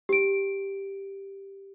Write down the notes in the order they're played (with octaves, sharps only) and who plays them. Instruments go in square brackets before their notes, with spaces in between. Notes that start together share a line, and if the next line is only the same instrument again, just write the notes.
[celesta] G4 D7